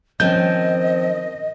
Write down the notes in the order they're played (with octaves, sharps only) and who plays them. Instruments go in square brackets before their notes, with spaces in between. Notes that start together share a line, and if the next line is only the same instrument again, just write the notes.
[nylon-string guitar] D#3 C#4 A#4 [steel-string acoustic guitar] F3 C4 [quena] D#5 [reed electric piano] G6